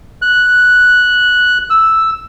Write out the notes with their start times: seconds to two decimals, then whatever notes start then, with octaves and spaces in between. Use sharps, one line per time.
0.22 F#6
1.70 E6